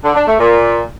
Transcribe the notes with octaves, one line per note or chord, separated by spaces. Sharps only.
D3
D4
A3
A#2